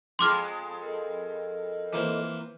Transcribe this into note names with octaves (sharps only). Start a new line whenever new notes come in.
F2 G#3 C6 D6 F6
A4 A#4 D#5
E3 A#3 C4